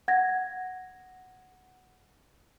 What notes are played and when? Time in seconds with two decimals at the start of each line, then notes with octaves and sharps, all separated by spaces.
0.08 F#5 G#6 A#6